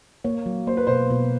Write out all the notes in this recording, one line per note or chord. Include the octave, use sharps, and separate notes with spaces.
A#3 C#5
F#3
A#3 C5
B4
B2 C5
B2